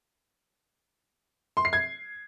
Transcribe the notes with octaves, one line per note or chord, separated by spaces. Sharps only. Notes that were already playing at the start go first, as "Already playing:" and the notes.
C6
C7
G#6